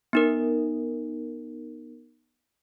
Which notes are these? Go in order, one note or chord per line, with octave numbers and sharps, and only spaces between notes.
B3 D#4 A#4